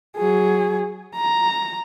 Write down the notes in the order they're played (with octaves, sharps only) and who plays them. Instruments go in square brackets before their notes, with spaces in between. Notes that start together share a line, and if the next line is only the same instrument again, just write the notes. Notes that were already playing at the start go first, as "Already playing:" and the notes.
[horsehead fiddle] F#3 G#4
A#5